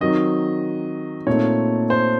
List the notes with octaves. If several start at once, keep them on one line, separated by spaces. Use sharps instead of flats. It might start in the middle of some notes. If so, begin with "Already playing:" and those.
D#3 F#3 C4 D#4 D#5
A#2 A3 C4 D#4 C#5
C5